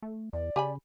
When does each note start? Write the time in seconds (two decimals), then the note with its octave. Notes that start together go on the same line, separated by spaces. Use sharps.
0.02 A3
0.33 E2 D5
0.56 C#3 G4 G#5 B5